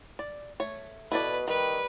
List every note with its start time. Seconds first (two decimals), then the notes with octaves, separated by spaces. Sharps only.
0.19 D5
0.60 A3 C#5
1.12 B2 E4 A4 B4 D5
1.48 D#3 G3 B4